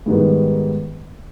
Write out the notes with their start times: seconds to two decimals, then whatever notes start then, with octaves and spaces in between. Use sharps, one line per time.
0.06 G#2 D#3 G3 B3